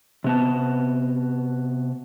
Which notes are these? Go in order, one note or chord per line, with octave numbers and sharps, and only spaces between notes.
C3 B3 A5